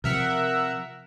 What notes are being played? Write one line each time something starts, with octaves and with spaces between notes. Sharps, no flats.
C3 F3 A#4 E5 F#5